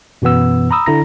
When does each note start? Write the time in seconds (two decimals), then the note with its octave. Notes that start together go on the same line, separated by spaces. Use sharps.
0.22 F#2 B2 E3 B3 E6
0.71 A#5 B5 D#6 E6
0.86 D3 E4 A#5 A#6